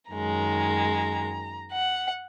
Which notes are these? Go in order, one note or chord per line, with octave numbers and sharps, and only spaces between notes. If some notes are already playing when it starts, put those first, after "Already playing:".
F#2 D#3 G#3 A#5
F#5